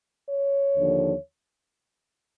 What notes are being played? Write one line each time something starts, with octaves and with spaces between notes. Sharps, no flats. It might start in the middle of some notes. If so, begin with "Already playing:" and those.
C#5
D#2 D3 F3